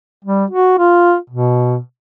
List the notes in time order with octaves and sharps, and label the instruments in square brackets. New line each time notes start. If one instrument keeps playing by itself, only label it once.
[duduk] G3
F#4
F4
B2